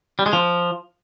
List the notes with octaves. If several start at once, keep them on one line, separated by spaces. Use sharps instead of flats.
G3
G#3
F3